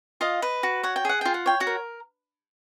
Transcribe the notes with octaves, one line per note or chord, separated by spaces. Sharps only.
F4 D#5 F5
B4
F#4
C#5 F#5
G5
G#4 F#5
F4 G5
F#5
C#5 G5
F#4 F#5
A#4